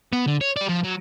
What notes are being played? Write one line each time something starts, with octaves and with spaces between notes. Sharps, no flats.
B3
D3
C#5
G4 D5
F3
F#3